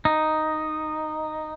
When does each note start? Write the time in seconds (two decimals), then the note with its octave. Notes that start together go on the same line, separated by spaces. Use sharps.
0.05 D#4